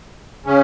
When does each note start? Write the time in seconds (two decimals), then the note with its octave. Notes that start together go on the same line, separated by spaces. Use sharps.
0.46 C#3 C#4